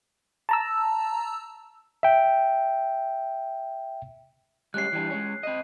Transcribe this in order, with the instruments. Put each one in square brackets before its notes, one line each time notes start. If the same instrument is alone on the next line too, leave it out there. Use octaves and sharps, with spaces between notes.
[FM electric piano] A5 A#5 E6
[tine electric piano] E5 G5
[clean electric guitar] G3 G#3 C#4 [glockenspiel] F#6 C7
[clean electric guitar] E3 G3 D4
G#3 C#4
C4 D#5